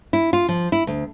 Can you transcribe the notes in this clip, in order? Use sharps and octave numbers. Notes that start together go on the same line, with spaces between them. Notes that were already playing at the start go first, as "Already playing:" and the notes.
E4
F4
F3
E4
D2